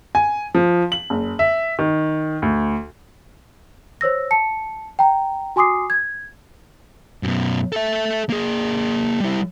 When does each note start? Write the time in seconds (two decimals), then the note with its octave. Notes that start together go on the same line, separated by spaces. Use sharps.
0.15 G#5
0.55 F3
0.92 F#7
1.10 F#1
1.39 E5
1.79 D#3
2.42 D2
4.01 C5 C#5 E6 A#6
4.31 A5 C#7
4.99 G5 A#5
5.56 F#4 G#5 C6 D6 D#6 C7
5.90 G#6
7.23 F#2 B2
7.72 A4 E5
8.29 A#3 G#4
9.20 G3 E4